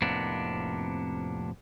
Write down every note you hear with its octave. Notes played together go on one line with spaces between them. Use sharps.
F2 A2 C3 A#3 B3 D4